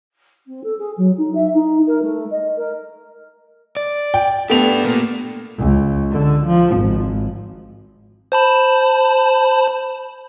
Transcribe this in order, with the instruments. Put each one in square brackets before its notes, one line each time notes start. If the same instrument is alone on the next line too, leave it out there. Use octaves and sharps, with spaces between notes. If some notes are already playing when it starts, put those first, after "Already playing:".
[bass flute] C4
A4
G#4
F#3
D#4
E5
D#4
A#4
A3
D#5
A#4
[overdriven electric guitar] D5
[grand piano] G5
[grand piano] A3 B3 F7 [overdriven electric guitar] D4 G4
[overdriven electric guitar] A#2 A#3
[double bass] C#2
D3
F3
G#1
[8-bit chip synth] C5 A5 B5